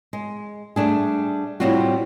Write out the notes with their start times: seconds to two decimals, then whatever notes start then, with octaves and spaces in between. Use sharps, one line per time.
0.13 G#3
0.76 G3 A3 D4 G#4
1.60 A2 C3 G3 C4 F4 F#4